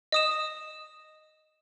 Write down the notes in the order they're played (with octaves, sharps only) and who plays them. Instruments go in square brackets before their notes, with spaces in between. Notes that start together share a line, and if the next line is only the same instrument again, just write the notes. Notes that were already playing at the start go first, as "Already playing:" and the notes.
[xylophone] D#5 D#6 E7